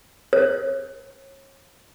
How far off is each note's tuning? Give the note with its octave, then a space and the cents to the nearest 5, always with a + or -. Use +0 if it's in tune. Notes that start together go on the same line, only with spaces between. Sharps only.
C#5 -35